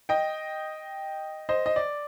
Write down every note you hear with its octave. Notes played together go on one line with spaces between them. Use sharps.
D#5 G5
C5 D#5
D#5
D5